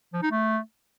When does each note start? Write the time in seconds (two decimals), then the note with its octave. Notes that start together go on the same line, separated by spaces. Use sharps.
0.13 F3
0.22 D#4
0.31 A3